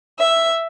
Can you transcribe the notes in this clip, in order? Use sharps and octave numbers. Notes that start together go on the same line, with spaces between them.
E5